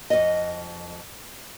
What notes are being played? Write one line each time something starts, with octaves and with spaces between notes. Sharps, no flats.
F2 D#5